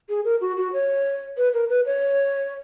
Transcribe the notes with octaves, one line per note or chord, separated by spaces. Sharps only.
G#4
A#4
F#4
F#4
C#5
B4
A#4
B4
C#5